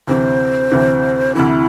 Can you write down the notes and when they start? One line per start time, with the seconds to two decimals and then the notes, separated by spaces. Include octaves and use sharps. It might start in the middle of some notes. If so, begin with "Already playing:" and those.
0.07 D2 C3 E3 C5
0.72 D2 C3 E3
1.35 D2 C3 E3 E4